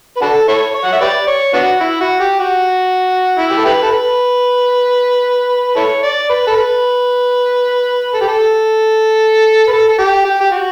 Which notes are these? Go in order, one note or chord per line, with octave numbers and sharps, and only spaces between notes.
B4
D4 F#4 A4
E4 A4 C#5
C#5
F#5
E5
G4 B4 D5
C#5
B3 D4 F#4
E4
F#4
G4
F#4
E4
G4
A4
E4 G4 B4
A4
B4
E4 A4 C#5
D5
B4
A4
B4
A4
G4
A4
B4
A4
A4
G4
G4
G4
F#4